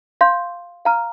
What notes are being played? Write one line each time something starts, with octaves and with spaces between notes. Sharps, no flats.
F5 C6 G6
F5 A#5 F6